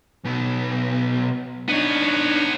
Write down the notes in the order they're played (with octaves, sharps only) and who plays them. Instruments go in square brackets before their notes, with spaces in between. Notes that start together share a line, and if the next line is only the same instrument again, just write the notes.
[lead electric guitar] B1 B3
[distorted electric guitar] B3 C#5 [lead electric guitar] D4 D#4